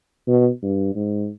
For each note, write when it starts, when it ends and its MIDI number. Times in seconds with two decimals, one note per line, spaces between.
0.27 0.49 47
0.63 0.95 43
0.95 1.29 44